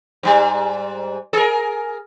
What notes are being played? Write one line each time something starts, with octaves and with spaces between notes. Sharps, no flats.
G#2 G3
G#4 A#4